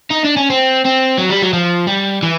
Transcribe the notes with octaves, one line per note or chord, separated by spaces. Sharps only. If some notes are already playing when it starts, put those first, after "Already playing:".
D#4
D4
C#4
C4
C4
F#3
G3
F#3
F3
G3
E3